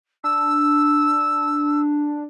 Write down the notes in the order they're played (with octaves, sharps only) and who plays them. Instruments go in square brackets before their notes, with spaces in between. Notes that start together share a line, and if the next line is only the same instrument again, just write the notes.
[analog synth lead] D4 [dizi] E6